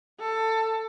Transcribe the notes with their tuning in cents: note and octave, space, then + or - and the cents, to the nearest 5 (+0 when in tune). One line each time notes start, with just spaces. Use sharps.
A4 +15